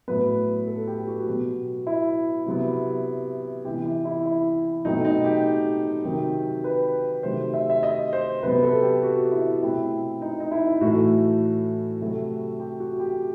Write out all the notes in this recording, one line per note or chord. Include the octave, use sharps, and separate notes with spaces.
A2 F#3 B3 B4
A4
G4
F#4
B2 F#3 B3
E4
C3 F#3 B3
C3 E3 B3 G4
E4
E4
E4
B2 F#3 A3 C4 D#4
D#4
G4
C3 D#3 F#3 C4
B4
C3 D#3 F#3 A3 C5
E5
E5
D#5
C5
C3 F#3 B3 B4
A4
G4
F#4
E4
B2 A3 C4 E4
D#4
D#4
E4
A2 E3 A3 F#4
C3 F#3 A3 C4
G4
F#4
G4